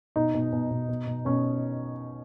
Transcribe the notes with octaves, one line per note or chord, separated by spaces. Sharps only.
B2 D#4
B2
B2
B2
B2
B2
B2 C#4